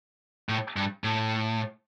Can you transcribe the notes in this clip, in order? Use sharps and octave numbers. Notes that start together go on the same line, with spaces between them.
A2
G2
A2